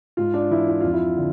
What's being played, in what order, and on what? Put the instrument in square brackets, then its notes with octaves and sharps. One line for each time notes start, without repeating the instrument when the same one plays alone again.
[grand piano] G#2 F4
D4
E3 E4
E4
F2 F4
E4
D3